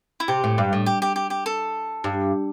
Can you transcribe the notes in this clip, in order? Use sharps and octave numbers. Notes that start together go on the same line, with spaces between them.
E4
C3 G4
A2
G2
A2
G4
G4
G4
G4
A4
G2